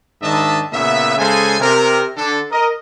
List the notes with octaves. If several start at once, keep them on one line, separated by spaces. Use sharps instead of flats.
G#2 D#3 D4 D#5 E5 A5
A#2 C#3 B3 E5
C#3 G#3 A4 C5 G#5
C3 A#4
D3 D4 A4
A#4 D#5